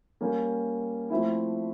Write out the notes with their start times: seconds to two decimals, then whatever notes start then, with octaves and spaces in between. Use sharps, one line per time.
0.21 G3 A#3 C#4
1.10 F3 A3 C4 E4